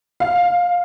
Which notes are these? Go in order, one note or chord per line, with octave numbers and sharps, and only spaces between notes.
F5